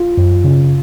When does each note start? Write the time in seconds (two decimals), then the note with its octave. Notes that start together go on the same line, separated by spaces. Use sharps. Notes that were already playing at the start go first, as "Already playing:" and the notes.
Already playing: F4
0.17 F#2
0.44 C#3